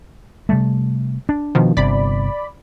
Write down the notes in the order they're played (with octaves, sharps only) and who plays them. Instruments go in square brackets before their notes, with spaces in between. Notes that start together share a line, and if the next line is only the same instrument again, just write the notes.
[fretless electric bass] C3 G3 A3
D4
[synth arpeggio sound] B2 D#3 F3
[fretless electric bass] G1 C3 [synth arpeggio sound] D5 B5